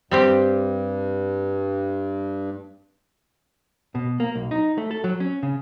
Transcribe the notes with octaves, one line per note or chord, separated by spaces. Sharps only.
G2 G3 C4 G4
B2
A#3
B1
D#4
A3
A4
F#3
C#4
C#3